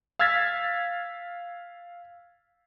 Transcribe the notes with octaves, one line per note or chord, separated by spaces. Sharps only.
F5 E6 F6 G#6 A6 B6